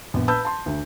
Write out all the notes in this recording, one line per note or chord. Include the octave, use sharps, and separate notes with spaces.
A#1 B3
B4 A5 B5 E6 G6
A5 C6
D2